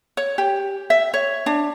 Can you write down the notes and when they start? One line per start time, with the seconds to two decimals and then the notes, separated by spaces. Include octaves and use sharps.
0.17 C#5
0.38 G4
0.90 E5
1.14 C#5
1.46 D4